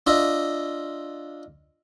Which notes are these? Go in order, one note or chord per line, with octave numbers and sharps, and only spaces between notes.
D4 F4 D#5 E5